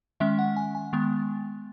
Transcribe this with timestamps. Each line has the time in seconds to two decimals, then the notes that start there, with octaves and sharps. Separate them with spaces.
0.20 D#3 G#3 C#4 E5
0.39 F#5
0.56 G#5
0.75 G#5
0.93 D#3 G#3 B3